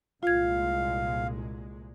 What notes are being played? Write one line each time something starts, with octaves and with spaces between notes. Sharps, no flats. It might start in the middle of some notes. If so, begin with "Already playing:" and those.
C2 A#2 G#3 F4 F5 G#6